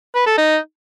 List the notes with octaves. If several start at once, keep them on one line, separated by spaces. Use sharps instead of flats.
B4
A4
D#4